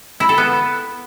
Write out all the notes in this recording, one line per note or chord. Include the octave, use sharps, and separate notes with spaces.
E4
A4
B3